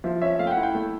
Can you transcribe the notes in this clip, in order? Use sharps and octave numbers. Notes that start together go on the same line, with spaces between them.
F3 E5
C#4 E5
A3 F5
G5
F#5
E4
G5
A3